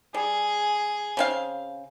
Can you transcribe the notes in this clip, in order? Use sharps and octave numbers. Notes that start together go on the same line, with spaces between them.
G3 G#4
C#3 C4 F5